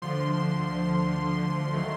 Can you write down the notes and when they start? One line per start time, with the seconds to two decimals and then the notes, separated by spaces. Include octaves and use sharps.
0.02 D2 D3 F3 C6
1.74 D#3 F#3 A3